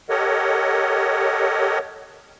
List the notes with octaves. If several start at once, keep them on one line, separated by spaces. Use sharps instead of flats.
G4 A4 A#4 C#5 D#5 F#5